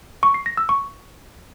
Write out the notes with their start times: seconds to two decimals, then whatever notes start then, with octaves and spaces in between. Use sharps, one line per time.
0.23 C#6
0.34 C7
0.46 A#6
0.57 E6
0.69 C#6